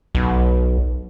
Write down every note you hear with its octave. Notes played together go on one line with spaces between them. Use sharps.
B1